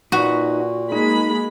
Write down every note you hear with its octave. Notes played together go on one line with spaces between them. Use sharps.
A#2 D#4 F#4 B4
G#3 A#3 D#4 B5